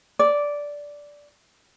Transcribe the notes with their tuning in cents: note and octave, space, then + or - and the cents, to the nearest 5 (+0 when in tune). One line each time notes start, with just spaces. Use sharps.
D5 -10